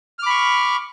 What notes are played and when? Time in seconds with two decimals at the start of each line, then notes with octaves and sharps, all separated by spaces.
0.19 F6
0.23 D6
0.26 B5
0.30 C#6